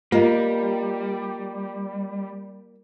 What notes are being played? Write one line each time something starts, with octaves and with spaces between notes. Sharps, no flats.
G3 A#3 F4 D#5